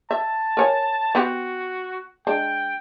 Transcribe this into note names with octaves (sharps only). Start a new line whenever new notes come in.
E5 A5
A#4 C#5 G#5
B3 C4 F#4 G4
G#3 D4 G5